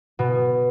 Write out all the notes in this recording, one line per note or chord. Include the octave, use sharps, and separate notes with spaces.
B2